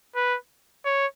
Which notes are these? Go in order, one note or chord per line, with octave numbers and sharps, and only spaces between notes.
B4
C#5